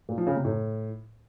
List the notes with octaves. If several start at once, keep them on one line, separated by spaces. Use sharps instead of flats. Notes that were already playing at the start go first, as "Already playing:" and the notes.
A#2
F3
C#3
C3
A2